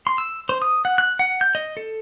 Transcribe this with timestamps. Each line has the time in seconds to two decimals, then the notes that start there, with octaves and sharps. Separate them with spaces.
0.07 C6
0.18 E6
0.49 C5
0.62 D#6
0.85 F#5
0.98 F#6
1.19 F#5
1.41 G6
1.55 D#5
1.77 A4